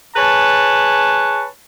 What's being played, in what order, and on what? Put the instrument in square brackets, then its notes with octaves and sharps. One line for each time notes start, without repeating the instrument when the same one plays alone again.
[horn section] G#4 B4 C#5 A5